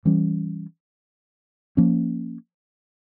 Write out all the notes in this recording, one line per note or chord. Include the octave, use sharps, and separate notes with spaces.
E3 G3 C#4
F3 A#3 C#4